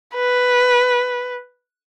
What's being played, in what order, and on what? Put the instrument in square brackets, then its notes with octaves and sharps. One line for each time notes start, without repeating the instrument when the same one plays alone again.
[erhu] B4